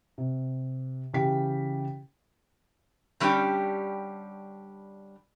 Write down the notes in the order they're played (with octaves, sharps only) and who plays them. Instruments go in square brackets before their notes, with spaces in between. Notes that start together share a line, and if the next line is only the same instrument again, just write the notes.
[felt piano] C3
C#3 E3 G4 G5 B6
[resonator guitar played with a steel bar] D3 G3 C#4 D4 G4